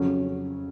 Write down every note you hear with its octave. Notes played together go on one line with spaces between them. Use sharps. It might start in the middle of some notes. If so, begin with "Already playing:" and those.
Already playing: F2 C#3 F#3 C#4